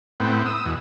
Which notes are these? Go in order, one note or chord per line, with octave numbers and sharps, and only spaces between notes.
A2 B3 C4
D#6 E6
E2 B2